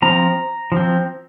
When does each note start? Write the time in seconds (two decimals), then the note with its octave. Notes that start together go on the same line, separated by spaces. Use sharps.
0.02 F3 C4 A#5
0.72 F3 C4